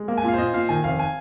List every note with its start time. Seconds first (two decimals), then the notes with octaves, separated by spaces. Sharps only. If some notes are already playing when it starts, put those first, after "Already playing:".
Already playing: G#3
0.08 A#3
0.18 G#5
0.23 A#2 F5
0.34 C5
0.38 A#2 D#5
0.53 A#2 F5
0.69 D#3 G#5
0.84 F1 F5
0.99 G#5